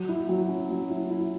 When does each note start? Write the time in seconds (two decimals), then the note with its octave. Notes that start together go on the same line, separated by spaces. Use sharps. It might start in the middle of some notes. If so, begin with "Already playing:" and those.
Already playing: F#3
0.09 E4
0.29 F#3
0.49 C#4
0.70 F#3
0.90 E4
1.10 E4